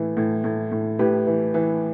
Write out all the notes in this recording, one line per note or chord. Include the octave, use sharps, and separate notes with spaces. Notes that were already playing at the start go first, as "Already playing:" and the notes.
Already playing: A2 E3
A2
A2
A2
A2 G4 B4
E3
E3